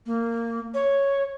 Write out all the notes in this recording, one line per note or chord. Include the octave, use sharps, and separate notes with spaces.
A#3
C#5